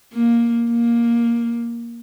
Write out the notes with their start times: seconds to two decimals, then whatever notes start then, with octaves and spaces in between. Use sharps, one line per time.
0.13 A#3
0.71 A#3